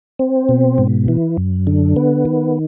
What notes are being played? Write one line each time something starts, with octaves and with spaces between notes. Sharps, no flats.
C4
B2
G#2
E3
F#2
D3
B3
D#3